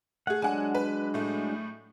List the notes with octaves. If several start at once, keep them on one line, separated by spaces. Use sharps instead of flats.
A3 G#4 F#5
F#3 G#3 D4 F#5 G#5
B4
A2 A3